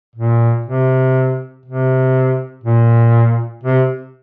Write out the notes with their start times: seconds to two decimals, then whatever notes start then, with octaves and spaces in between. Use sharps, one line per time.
0.16 A#2
0.66 C3
1.66 C3
2.64 A#2
3.64 C3